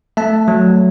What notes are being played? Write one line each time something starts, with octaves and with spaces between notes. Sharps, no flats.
A3 E5 A5
F#3